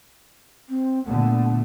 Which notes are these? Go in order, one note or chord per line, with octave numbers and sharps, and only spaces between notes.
C4
A#2 D3 A3 B3